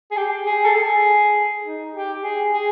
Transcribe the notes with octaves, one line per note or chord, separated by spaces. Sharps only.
G#4
G4
G#4
A4
G#4
D#4
G4
G#4
G#4